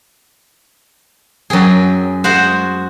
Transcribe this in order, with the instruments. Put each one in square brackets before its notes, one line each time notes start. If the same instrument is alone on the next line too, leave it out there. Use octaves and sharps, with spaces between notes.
[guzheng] F#2 G#4 [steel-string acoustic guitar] F#3 G5
[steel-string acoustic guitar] G#3 [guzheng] F#4 C5 F#5